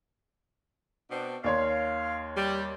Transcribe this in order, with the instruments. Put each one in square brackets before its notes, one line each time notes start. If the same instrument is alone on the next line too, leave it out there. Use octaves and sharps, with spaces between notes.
[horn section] B2 C4 D4
[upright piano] D#2 C#5 C6 [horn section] F5
[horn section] G3